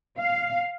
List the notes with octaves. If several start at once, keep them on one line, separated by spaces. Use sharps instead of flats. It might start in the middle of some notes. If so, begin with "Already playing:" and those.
F5